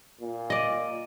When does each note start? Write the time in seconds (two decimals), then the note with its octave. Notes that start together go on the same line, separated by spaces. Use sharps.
0.21 A#2
0.50 D5 D#5